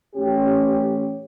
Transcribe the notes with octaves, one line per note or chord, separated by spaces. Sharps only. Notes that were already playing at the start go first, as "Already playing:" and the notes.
A1 C#4 G4